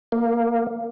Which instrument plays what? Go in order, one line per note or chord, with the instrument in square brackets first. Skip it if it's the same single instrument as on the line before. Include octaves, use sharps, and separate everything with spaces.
[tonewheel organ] A#3